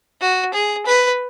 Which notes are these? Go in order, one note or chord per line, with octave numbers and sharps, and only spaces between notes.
F#4
G#4
B4